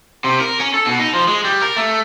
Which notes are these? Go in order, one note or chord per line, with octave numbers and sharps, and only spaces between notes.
C3
A#4
C#4
A4
B2
D#4
F3
G#3
G3
A#4
A3